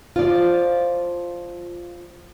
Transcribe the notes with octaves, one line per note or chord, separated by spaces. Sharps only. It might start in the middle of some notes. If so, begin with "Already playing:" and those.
F3 F4 D5